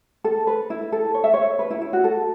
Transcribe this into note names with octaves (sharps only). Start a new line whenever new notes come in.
A4
B4
E4
A4
C#5
E5
C#5
B4
E4
E4
F#4
A4